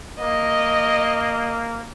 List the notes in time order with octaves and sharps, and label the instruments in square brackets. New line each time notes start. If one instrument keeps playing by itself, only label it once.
[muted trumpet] A#3 [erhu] D#5